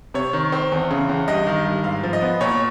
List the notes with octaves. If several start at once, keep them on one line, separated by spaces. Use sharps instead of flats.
C3 C#5
D#3
C4
E2
C#3
E2
G2 D#5
D#3
G2
G#2 F5
F3
D#5
B3
A#2 C#5